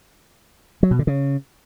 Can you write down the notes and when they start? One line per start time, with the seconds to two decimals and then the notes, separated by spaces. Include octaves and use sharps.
0.83 F#3
0.91 B2
0.99 D3
1.07 C#3